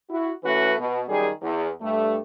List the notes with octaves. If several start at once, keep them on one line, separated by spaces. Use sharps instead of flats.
E4 F#4
E3 A3 C#4 F#4 B4
B2
F#2 D#3 G3 G#4
E2
G2 A3